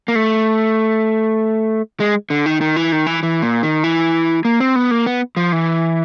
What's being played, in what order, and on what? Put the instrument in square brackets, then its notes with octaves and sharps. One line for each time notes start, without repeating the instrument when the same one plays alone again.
[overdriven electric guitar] A#3
A3
G#3
D3
D#3
D#3
E3
D#3
E3
E3
A#2
D#3
E3
A#3
C4
B3
A#3
B3
F3
E3